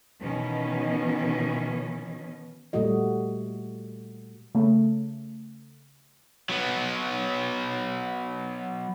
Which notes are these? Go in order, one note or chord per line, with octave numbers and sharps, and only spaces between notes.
B2 D#3 E3 C#4
A#2 G3 A3 F#4 D#5
C#3 A3
F#3 B3